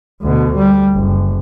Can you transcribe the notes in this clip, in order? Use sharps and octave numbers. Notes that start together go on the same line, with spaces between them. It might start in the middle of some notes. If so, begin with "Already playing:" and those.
D2 B2
G3
F#1